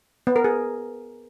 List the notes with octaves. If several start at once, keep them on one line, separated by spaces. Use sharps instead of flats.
B3
A#4
G#4